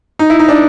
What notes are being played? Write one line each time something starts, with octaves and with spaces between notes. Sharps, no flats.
D#4
E4
D#4
D4